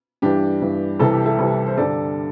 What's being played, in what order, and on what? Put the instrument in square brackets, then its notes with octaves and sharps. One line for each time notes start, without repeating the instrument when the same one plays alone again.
[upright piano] G2 E3 D4 G4
G2 E3
C2 C3 E3 A4
G4
E4 A4
C2 C3 E3
C5
G2 D3 A4 D5